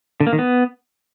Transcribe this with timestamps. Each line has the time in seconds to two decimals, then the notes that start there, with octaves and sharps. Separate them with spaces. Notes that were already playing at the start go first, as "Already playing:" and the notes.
0.20 D3
0.27 A#3
0.33 D#3
0.39 B3